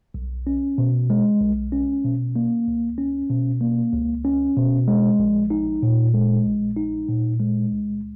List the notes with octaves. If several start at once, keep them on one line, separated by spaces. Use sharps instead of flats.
B1
C#4
B2
G#3
B1
C#4
B2
A#3
C#2
C#4
B2
A#3
C#2
C#4
B2
G#3
A#1
D#4
A#2
G#3
A#1
D#4
A#2
G#3
C#2